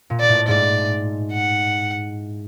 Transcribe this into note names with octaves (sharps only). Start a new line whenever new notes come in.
A#2
D5
A2
G#2 D5
F#5